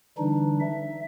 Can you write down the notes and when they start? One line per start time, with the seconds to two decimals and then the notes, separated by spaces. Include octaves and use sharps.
0.18 D3 E3 G3 D4 D#4
0.61 E5